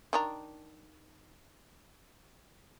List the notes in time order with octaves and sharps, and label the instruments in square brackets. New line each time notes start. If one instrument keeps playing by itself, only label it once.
[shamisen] D#3 D4 A#5